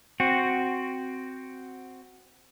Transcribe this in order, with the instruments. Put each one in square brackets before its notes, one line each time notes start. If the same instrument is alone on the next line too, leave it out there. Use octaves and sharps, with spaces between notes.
[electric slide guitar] C4 F#4